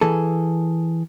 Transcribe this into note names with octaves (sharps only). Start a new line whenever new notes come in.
E3 G#4 A4